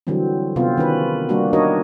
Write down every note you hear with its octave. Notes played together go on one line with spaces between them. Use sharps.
D3 E3 F#3 G3 C4
C3 B3 C4 F4
D#3 C#4 B4
G3 A#3 D4 F#4
D4 D#4 F#4 A#4 C#5 D#5